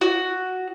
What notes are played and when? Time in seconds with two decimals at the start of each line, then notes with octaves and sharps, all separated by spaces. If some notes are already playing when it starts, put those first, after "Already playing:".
0.01 F#4